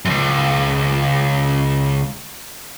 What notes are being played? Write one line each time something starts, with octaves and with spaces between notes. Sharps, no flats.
C#2 F#2